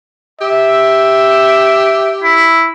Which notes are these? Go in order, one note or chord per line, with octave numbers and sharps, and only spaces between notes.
G4 E5
E4